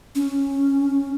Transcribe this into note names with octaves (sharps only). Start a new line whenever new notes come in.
C#4